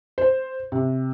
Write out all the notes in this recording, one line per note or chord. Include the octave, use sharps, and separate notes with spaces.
C5
C3